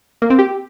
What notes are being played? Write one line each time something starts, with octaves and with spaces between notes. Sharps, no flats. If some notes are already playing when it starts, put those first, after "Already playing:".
A#3
C4
G4